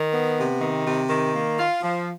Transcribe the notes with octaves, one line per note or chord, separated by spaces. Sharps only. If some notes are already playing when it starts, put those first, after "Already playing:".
Already playing: D#3
B3
C3
D#3
C3
D#3
A#3
F4
F3